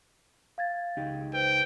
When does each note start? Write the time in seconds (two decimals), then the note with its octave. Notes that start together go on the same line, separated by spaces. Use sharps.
0.58 F5 G#6 A6
0.97 C#2 D#4 G4
1.33 B4 C5 G5